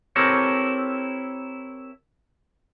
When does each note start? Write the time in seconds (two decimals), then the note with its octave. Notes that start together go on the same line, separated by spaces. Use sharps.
0.16 C4 E4 G4 A4 A#4 C#5